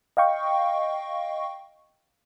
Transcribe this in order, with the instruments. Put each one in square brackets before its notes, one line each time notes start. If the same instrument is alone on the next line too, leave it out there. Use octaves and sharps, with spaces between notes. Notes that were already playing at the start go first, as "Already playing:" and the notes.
[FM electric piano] D#5 F5 G5 C#6